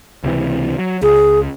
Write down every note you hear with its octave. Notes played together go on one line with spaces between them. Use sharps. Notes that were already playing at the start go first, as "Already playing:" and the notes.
C#2 C3 E3
F#3
C#2 G#4